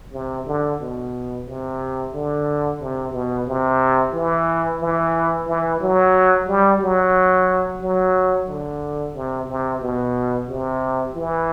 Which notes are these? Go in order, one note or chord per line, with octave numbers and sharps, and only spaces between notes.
C3
D3
B2
C3
D3
C3
B2
C3
E3
E3
E3
F#3
G3
F#3
F#3
D3
C3
C3
B2
C3
E3